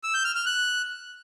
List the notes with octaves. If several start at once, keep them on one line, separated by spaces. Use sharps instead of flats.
E6
G6
F6
F6
F#6